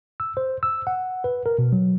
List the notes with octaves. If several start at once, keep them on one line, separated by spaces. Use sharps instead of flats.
E6
C5
E6
F#5
B4
A#4
B2
F#3